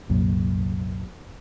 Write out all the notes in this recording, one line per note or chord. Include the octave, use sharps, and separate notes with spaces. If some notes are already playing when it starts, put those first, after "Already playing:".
C2 F#2 A#2